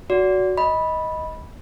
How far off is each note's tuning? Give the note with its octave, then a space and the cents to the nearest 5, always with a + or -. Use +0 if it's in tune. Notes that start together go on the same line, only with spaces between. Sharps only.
F#4 +0 D5 -35
D#5 +15 B5 -10